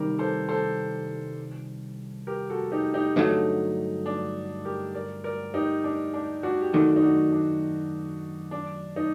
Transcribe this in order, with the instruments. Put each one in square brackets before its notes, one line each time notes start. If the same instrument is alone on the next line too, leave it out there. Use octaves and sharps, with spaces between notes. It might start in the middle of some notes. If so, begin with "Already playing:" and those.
Already playing: [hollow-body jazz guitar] C2 C3 D#3 G3 [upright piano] G4 A#4
[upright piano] A4 C5
A4 C5
G4 A#4
F#4 A4
D#4 G4
D#4 G4
[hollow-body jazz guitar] G2 D3 F#3 A3 [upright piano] D#4
[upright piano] D4
G4 A#4
A#4 D5
A#4 D5
D#4 G4
D4
D4
D4 F#4
G4
[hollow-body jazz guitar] F#2 D#3 A3 [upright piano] D4 F#4
[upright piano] D#4
D4 F#4
D4
D4
D#4